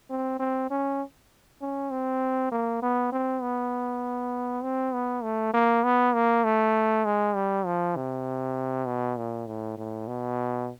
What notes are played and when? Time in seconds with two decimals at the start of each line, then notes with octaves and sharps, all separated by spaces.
0.10 C4
0.40 C4
0.70 C#4
1.62 C#4
1.91 C4
2.52 A#3
2.82 B3
3.12 C4
3.42 B3
4.63 C4
4.94 B3
5.23 A3
5.54 A#3
5.84 B3
6.14 A#3
6.44 A3
7.05 G#3
7.36 G3
7.66 F3
7.96 C3
8.87 B2
9.17 A#2
9.47 A2
9.77 A2
10.07 B2